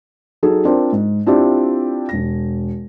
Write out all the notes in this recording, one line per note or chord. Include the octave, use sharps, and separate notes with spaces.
F#3 D#4 G#4 A4
C4 D4 F4 A#4 C5 D5
G#2
C4 D4 E4 F4 G4 D5
E1 A#6